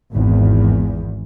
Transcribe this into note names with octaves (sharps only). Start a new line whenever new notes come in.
G#1 E2